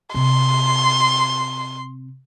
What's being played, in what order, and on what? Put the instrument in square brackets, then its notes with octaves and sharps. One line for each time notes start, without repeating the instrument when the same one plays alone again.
[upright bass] C3 [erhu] C6